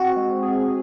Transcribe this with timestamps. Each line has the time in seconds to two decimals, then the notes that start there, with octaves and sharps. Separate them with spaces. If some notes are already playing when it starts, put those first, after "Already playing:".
Already playing: C4 F#4
0.16 G#3
0.42 G#4